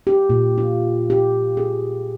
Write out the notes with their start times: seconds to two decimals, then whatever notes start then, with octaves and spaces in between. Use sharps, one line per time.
0.07 G4
0.30 A#2
0.58 F4
1.10 G4
1.57 G#4